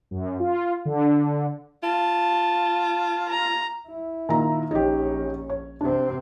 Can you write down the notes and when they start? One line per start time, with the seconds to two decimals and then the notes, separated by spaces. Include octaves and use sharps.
0.11 F#2
0.40 F4
0.85 D3
1.83 F4 A5
3.29 A#5
3.87 E4
4.29 A#2 D#3 A#5
4.71 A#1 C#4 D#4 G4
5.50 C#5
5.81 C3 C4 D4